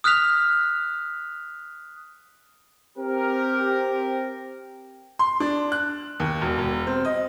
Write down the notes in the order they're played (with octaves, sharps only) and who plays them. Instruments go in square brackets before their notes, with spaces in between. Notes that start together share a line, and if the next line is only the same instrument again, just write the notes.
[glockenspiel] D#6 F6 F#6 B6 F7
[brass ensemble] C4 G4 A#4
[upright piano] C6
D4
F#6
D#2
E1
E1
C4
D#5